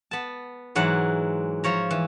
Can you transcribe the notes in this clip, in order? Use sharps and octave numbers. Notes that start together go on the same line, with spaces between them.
B3 A5
G#2 E3 F#3 F#5
F3 C#5 A#5
E3